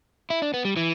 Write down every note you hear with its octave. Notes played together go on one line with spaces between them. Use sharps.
E4
D4
B3
G3
E3